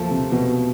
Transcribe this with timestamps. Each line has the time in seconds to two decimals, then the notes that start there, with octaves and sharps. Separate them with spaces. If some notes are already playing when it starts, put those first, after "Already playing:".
Already playing: F3 A3 A#3
0.11 C3
0.32 B2